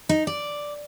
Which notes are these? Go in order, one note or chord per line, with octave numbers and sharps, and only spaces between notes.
D#4
D5